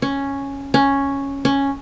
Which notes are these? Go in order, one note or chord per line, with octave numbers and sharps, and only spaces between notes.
C#4
C#4
C#4